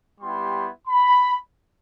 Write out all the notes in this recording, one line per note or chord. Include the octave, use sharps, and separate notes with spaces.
G3 B3 E4 G4 C6
B5